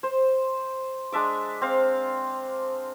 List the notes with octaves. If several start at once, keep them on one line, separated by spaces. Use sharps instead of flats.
C5
G#3 D4 E5 D6
C4 F5